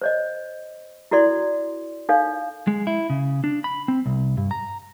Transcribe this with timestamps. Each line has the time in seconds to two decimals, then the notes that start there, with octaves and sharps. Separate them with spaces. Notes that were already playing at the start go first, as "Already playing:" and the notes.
0.02 C5 C#5 D#5
1.11 E4 F#4 A4 D5 C6
2.09 D#4 A4 C#5 F5
2.68 G#3
2.87 E4
3.10 C#3
3.44 D4
3.64 B5
3.88 C4
4.06 C2
4.37 G2
4.51 A#5